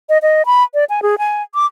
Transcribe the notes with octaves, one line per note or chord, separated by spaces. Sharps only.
D#5
D#5
B5
D5
G#5
G#4
G#5
D6